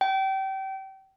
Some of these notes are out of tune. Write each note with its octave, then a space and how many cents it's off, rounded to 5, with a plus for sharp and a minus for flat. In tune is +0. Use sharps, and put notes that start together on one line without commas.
G5 -30